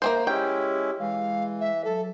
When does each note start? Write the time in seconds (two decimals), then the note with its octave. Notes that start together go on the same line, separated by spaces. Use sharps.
0.02 A#3 C4 C5 E5
0.27 G#3 C#4 E4 G4 G5
1.00 E3 G#3 F5
1.61 E5
1.85 F#3 A4